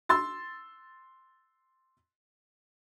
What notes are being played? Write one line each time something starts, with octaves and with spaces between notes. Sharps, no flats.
C6 E6 A6